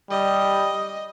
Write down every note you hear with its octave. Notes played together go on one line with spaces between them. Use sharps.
G3 D#5